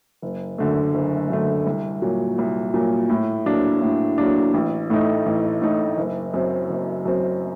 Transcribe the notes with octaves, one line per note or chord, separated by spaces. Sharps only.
F#1
F#2 D3 A3
F#1
F#2 D3 A3
C2
A#2 F#3
C2
A#2 F#3
A2
F#3 A#3 D4
A2
F#3 A#3 D4
A1
A2 A3 D#4
A1
A2 A3 D#4
F#1
F#2 F#3 C4
F#1
F#2 F#3 C4